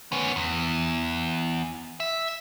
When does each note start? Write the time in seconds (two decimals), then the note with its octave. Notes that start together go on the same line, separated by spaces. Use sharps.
0.12 B3 C#4
0.36 E2
2.00 E5